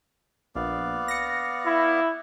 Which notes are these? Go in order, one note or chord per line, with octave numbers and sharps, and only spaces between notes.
A#1 B3 D5 F5
A#6 C#7
E4